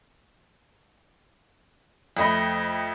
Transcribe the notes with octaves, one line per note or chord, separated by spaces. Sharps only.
F2 A3 D#5 B5